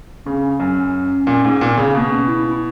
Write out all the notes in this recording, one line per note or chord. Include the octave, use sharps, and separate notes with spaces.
C#3 C#4
F#2 C#4
A#2
G#2
A#2
C#3
B2 A#3
C#4
E4
E4